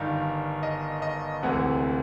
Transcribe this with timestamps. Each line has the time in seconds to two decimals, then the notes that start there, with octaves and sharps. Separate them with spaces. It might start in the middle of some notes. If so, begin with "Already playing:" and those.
Already playing: G1 G2 D#3 F5
0.63 D#5
1.02 D#5
1.43 E1 D2 C3 E3 F#5